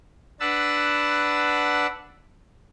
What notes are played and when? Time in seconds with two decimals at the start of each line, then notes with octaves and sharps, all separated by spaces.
0.40 D4 B4 F#5 A5 E6